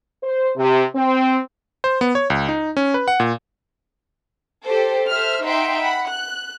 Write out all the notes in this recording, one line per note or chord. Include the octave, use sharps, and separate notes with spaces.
C5
C3
C4
C5
B3
C#5
C#2
D#4
C#4
B4
F#5
A#2
G4 A4 C5
A4 C5 E5 F6
D#4 E5 F#5 G5 C6 D7
F#5 B5
F#6